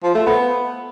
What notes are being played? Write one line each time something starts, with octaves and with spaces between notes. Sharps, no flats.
F3
A3
B3